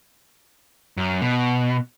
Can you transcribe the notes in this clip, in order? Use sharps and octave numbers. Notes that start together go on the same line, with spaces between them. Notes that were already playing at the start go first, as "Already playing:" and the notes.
F#2
B2